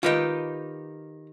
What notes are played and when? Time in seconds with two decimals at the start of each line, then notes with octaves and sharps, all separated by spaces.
0.03 D#3 D#4 F4 G4 B4 D#5